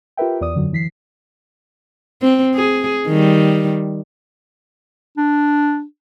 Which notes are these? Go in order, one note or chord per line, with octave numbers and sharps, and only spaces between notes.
F4 G4 A#4 B4 E5 G5
E2 D5 D#6
F#2 D3 F#3
E3 B6 C7
C4
G#4
D#3 G3
D4